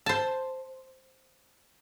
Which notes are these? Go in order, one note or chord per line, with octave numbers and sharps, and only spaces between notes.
C5 A5